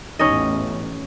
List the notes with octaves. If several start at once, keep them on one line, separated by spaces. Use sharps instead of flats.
A1 E2 A2 C#4 D#4 D#5